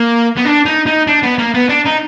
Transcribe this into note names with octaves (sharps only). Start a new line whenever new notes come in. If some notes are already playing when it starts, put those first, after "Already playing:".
Already playing: A#3
B3
D4
D#4
D#4
D4
B3
A#3
B3
D4
D#4